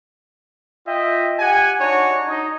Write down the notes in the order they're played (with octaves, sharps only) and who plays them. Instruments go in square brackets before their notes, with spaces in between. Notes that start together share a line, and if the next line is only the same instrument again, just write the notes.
[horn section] F4 D#5 E5 G5
G4 F#5 G#5
D4 D#4 F#4 C#5
D#4